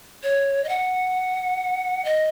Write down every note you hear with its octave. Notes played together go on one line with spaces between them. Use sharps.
C#5
D#5
F#5
D#5